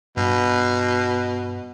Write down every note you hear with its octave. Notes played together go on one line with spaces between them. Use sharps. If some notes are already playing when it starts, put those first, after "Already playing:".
G2 B2